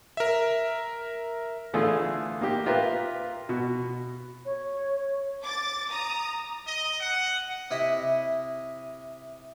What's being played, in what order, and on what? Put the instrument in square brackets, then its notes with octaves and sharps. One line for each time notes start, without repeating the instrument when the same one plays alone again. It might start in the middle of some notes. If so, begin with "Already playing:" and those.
[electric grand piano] A#4 E5
[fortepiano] D3 E3 A3 F4 G#4
A#3 G4
F4 G4 A#4 B4 E5
B2 F#4
[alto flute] C#5
[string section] D6 A6
A#5 D#6
[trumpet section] D#5
F#5
[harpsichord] C3 E4 D#5 B5